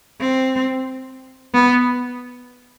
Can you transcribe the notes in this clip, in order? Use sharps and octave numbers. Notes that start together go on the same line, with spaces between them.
C4
B3